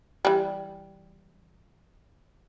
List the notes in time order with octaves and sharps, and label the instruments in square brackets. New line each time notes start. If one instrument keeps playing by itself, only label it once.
[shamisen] E3 G3